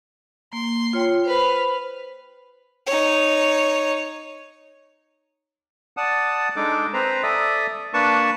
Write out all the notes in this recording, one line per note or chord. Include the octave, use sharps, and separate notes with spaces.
A#3 C6
F4 C#5 G5
B4 C5 F6
D#4 C#5
D5 F#5 A5 D#6
G#3 D4 D#4 A4 D6
C4 B4 C5 A#5
A4 D5 E5 D#6
A#3 D4 B4 A5 C#6